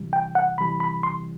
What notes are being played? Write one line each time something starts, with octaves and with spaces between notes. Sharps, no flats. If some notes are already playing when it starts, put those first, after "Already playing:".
Already playing: C3 E3 G3
G5
F#5
C3 E3 G3 B5
B5
C6